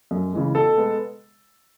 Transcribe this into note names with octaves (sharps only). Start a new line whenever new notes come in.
F#2
C#3 E3 G#3
B2 A4
G#3 B3